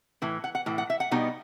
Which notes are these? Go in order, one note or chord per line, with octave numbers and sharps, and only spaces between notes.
A2 E3
F#5
F#5
A2 E3
F#5
E5
F#5
B2 G3 B3 D#4